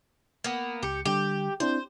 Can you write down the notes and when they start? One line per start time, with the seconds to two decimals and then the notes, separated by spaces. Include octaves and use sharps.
0.44 A#3 B3
0.83 C#2 G4 C#7
1.05 D3 G3 G4
1.60 C4 D4 E4 C5